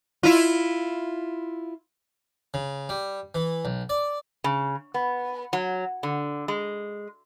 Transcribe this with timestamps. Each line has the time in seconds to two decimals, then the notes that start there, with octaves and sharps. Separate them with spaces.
0.23 E4 F4
2.54 C#3
2.89 G3
3.35 E3
3.65 B1
3.89 D5
4.44 C#3
4.94 B3
5.53 F#3
6.03 D3
6.48 G#3